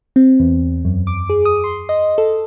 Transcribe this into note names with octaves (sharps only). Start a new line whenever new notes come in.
C4
E2
F#2
D6
G#4
D#6
C6
D#5
A4